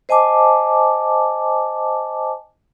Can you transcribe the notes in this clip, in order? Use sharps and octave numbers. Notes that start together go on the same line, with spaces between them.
C5 D#5 G#5 A5 D6